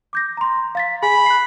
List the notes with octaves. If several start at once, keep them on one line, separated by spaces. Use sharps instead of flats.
D6 G6 A#6
A#5 C6
F5 A6 B6
G#4 G#5 B5
F#6 C7